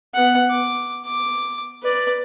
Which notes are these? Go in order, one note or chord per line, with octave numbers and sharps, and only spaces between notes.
B3 F#5
D6
D6
B4 D5